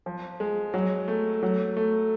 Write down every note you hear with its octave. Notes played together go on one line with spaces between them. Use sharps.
F3
G#3
F#3
A3
F#3
A3